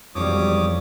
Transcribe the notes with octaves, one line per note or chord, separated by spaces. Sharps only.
E1 F2 G3 C#5 D6 D#6